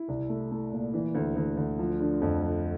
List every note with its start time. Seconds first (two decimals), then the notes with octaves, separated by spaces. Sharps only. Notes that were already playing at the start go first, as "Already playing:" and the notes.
Already playing: E4
0.08 C2
0.29 A3
0.51 A3
0.72 A#2
0.94 E3
1.15 D2
1.36 D2
1.57 D2
1.79 F3
2.00 D3
2.21 F2
2.43 F3